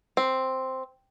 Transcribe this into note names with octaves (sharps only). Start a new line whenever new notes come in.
C4